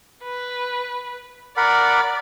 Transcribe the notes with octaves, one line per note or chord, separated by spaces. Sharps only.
B4
A#4 D5 F#5 B5